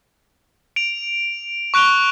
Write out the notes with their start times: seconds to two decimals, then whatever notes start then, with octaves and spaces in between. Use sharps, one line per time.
0.76 D7 F7
1.74 C#6 F#6 D7 F7 G7